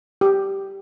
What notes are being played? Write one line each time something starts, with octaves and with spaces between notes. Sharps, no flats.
G4